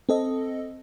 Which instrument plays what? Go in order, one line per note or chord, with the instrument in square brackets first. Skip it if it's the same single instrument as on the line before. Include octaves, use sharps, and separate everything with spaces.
[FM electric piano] C4 A4 D#5